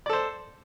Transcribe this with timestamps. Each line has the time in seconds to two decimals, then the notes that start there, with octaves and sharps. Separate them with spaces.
0.06 D5
0.09 A4
0.13 C5